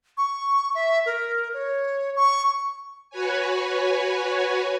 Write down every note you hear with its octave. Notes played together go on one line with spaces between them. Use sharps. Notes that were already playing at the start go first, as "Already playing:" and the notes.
C#6
E5
A#4
C#5
C#6
F#4 B4 C#5 G#5